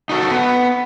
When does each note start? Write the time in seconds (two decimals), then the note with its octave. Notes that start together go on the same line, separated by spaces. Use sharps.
0.09 D#4 F#4 G#4 A4
0.31 B3